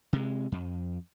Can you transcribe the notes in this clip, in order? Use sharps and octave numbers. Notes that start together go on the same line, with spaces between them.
C3 G#3
F2